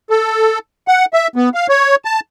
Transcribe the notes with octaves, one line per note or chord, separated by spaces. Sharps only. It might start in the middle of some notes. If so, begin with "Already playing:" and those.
A4
F#5
E5
B3
F5
C#5
A5